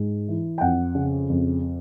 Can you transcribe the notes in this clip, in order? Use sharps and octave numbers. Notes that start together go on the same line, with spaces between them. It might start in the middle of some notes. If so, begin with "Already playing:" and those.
Already playing: G#2
E3
G5
F2 F#5
C#3
F2